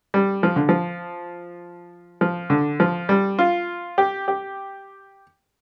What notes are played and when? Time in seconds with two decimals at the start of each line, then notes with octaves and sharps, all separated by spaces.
0.14 G3
0.43 F3
0.56 D3
0.69 F3
2.21 F3
2.50 D3
2.80 F3
3.09 G3
3.39 F4
3.98 G4
4.28 G4